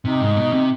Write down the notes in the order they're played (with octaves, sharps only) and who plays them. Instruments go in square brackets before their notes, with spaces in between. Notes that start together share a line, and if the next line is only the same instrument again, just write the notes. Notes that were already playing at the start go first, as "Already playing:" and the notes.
[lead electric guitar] C3 [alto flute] D#4
[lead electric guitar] G#2
B2
C3